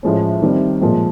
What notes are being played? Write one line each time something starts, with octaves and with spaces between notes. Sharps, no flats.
A2 F3 G#3 C#4
D#3 G3 C4
A#2 F3 G#3